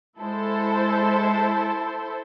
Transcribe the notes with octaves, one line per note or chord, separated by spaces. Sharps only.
G#3 E4 A4 C5